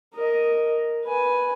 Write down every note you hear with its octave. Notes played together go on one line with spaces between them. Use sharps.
A#4 D#5
B4 G#5